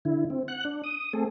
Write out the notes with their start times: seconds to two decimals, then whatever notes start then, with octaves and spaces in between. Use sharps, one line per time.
0.05 D3 E4
0.30 C4
0.48 F#5 F#6
0.65 D4
0.84 D#6
1.13 A3 C4 G#4 A4